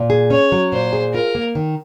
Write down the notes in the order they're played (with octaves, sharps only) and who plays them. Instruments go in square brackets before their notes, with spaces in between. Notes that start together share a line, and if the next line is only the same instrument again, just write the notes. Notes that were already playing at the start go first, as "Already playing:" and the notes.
Already playing: [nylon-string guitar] A#2
G#4
[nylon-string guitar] C#4 [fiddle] C#5
[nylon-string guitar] F#3
[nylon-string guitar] A#2 [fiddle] C5
[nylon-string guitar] G#4
[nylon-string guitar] F4 [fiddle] A#4
[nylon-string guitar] A#3
D#3